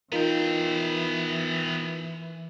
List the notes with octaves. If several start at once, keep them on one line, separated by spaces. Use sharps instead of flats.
E3 B3 D#4 F4 A#4 G5